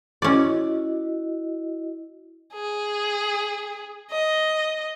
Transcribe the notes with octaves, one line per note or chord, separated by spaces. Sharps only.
C#4 E4 F#4 D5 D#5
G#4
D#5